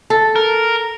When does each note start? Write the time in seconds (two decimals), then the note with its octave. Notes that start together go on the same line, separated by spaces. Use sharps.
0.10 A4
0.36 A#4